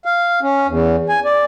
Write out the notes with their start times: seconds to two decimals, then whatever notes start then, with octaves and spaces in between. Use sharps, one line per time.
0.05 F5
0.42 C#4
0.67 E2
1.09 G#5
1.25 D5